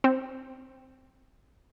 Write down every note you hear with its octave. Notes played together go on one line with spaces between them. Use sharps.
C4